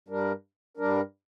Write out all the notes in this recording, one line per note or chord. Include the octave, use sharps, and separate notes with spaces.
G2 G3 D4 A#4
G2 G3 D4 A#4